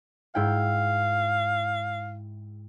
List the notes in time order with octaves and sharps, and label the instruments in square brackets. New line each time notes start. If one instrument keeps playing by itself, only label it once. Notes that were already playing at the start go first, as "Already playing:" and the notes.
[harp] G#2 E4 G5 [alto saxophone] F5